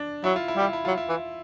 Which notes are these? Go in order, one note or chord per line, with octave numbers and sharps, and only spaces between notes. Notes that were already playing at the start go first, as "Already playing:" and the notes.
Already playing: D4
F#3 E4
F4
E4
G3 F4
E4
F#3 F4
E4
E3